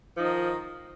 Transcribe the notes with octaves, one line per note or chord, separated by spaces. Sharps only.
D#3 F3 D#4